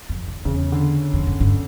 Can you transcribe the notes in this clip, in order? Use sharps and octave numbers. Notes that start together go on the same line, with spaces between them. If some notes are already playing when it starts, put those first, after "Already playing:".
F2
E2
E2 C#3
D3
F2
F#2
G2